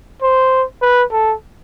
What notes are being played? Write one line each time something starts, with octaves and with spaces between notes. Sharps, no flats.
C5
B4
A4